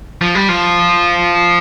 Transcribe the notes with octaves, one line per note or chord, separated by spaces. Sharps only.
F3
G3
F3